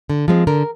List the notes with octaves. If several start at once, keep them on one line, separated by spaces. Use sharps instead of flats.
D3
F3 G#3 C4
D3 A#4